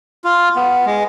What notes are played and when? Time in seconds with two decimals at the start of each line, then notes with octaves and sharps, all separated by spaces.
0.24 F4
0.56 B3
0.86 G#3